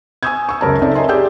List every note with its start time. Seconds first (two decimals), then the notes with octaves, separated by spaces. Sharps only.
0.23 G#5 C#6 D#6 E6 G6 G#6
0.49 C#6 E6
0.61 C#2 F#2 A#4 A5
0.81 C4 D#4 A4 D5 E5
0.95 A#4 C#5 D#5 E5 G#5 C6
1.09 G4 G#4 D5 G5 E6 G6